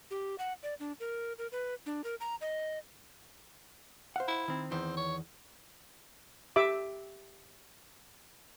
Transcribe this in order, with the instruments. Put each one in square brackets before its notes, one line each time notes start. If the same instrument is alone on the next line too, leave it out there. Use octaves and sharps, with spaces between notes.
[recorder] G4
F#5
D5
D4
A#4
A#4
B4
D4
A#4
A#5
D#5
[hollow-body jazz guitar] C5 F5 F#5
[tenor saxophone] E4
[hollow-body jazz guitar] D#3 C4
[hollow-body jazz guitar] E2 D#3 E3 [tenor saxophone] C4
[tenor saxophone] C#5
[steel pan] G4 E5 D6